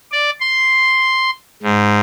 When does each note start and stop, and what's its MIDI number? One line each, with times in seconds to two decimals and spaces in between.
0.12 0.30 74
0.41 1.30 84
1.63 2.01 44